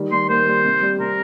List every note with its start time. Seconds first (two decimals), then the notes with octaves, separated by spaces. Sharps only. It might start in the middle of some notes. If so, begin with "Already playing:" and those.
Already playing: D#3 G3
0.11 G3 C6
0.29 A#3 C5
0.47 G3
0.65 C3
0.82 G3
0.99 C3 A#4